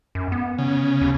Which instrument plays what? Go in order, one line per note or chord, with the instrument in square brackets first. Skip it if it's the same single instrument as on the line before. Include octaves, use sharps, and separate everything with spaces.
[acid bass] F#2
B3
[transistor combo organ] C#3
[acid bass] D#2